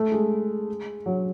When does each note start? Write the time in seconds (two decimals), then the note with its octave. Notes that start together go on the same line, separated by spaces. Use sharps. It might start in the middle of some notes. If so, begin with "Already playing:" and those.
Already playing: A3
0.12 G#3
1.06 F#3